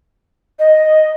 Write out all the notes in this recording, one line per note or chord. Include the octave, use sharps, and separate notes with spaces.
D#5